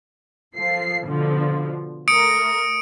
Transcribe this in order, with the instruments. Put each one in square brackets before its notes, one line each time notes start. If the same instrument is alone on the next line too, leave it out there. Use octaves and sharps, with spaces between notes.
[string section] F3 A4 C7
B2 D3 F3
[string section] A3 A#4 [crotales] D#6 C#7 D7